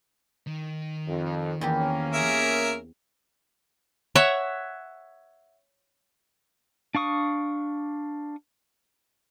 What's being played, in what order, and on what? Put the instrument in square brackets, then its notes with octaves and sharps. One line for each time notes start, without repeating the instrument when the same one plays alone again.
[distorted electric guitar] D#3
[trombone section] F2
[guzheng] E2 C4 G4 [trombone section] A#3 C#4
[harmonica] G#4 A#4 E5
[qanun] C#5 E5 F#5
[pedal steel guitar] D4 F5 C#6 D#6